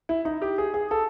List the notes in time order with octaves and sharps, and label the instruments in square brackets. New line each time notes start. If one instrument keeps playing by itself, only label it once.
[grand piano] E4
D#4
G4
G#4
G#4
A4